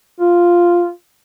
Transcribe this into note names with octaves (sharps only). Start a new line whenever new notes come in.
F4